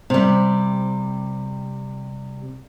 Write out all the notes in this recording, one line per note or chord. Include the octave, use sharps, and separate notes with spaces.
C3 G3